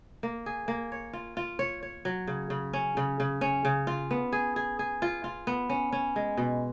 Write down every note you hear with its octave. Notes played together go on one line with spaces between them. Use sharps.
A#3
G#4
A#3
C#5
F4
F4
C#5
C#5
F#3
C#3
C#3
C#4
C#3
C#3
C#4
C#3
F4
B3
G#4
G#4
G#4
F4
F4
B3
C#4
C#4
G#3
B2